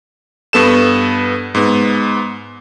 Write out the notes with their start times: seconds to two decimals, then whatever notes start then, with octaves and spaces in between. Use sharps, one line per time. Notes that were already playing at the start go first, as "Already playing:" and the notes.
0.53 G2 B3 A4 E7
1.55 G#2 B3